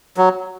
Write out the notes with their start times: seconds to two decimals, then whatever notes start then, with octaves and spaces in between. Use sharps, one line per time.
0.17 F#3